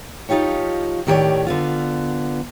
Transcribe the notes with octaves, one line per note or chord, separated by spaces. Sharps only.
F3 D#4 F4 G4 C#5
A2 D#3 G4 A4 C#5 D5
D3 B3 F4